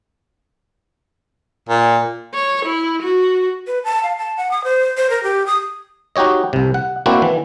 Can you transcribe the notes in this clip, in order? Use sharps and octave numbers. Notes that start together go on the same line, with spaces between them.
A#2
C#5
E4
F#4
B4
A5
F5
A5
F#5
D#6
C5
C5
A#4
G4
D#6
D#4 F#4 G4 C#5 D#5
C2 C3
F#5
A#3 C4 D4 E4 F#4 E5
E3